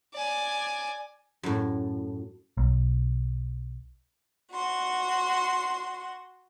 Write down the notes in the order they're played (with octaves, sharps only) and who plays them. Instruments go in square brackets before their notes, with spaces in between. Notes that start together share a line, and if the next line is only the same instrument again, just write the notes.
[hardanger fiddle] D5 G#5
[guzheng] F#2 A2
[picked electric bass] B1
[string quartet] F#4 C6